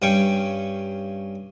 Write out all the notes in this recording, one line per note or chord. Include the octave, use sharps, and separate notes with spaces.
G2 C#4 G5 C#6